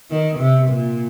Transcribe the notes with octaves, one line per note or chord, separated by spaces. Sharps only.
D#3
C3
A#2